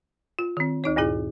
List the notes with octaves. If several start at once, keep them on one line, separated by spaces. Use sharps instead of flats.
F4
D#3 C4
D2 D#4 C#5
D2 G2 A#2 E4 G#4